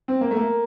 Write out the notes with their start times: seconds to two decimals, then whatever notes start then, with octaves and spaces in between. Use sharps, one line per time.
0.08 C4
0.21 A#3
0.31 A3
0.36 A#3